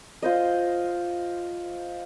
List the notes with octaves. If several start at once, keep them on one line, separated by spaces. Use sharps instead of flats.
F4 C5 D#5